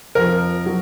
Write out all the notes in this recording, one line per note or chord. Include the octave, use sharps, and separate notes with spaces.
F2 F3 A#4
F#3